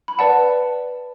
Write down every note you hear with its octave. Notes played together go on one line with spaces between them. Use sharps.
B5
B4 D5 F#5 A5